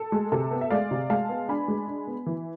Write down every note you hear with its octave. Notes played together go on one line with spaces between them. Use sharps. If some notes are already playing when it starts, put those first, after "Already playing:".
Already playing: A4
G#3
C3 A4
B3
E5
G#3 D5 F5
C3
G#3 F5 A5
B3
D4 G#5 B5
G#3
D4
B3
E3